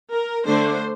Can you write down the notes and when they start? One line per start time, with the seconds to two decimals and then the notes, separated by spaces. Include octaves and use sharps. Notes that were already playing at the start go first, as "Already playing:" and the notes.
0.10 A#4
0.45 D3 A3 D4 C5